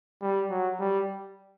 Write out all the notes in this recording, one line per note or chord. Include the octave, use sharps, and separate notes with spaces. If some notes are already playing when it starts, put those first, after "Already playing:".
G3
F#3
G3